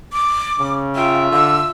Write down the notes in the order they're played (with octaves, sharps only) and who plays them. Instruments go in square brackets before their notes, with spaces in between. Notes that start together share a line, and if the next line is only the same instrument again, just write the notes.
[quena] D6
[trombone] C#3
[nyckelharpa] F4 E5 [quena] G5
[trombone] D3 [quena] E6